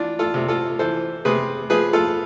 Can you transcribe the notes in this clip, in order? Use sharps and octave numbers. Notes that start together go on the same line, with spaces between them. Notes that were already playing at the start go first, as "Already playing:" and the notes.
Already playing: E3 D4 F4
F4 A4
C3
F4 A4
E3 A4 C5
C3 G#4 B4
F3 G#4 B4
F4 A4